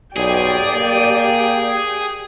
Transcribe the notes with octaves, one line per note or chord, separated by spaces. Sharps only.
B1 G4 G#4 D5 G5
A#3